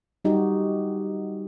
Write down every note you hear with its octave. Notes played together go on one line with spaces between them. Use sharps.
G3 D#4 F#4 G4